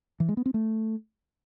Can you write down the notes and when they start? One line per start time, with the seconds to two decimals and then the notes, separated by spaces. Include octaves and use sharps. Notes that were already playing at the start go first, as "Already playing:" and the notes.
0.20 E3
0.29 G#3
0.37 B3
0.46 C4
0.54 A3